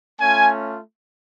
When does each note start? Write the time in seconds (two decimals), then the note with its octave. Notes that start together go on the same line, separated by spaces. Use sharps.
0.20 A3 C#4 F4 G#5